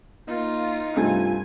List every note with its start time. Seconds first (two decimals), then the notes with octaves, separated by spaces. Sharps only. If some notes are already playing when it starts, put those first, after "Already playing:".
0.28 A#3 D#4 F4
0.97 G2 C3 A3 F4 G#5